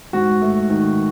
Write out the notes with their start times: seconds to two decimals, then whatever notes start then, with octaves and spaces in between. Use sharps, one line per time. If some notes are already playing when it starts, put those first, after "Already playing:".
0.13 G#2 F#4
0.42 A3
0.70 D#3